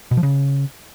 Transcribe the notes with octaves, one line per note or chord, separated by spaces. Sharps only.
B2
F3
C#3